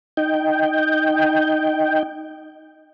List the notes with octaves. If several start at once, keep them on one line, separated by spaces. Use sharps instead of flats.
D#4 G5